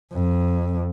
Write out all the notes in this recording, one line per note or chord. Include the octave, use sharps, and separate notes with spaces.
F2